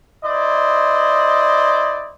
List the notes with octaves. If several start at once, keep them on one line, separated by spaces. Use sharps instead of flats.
E4 C5 D5 D#5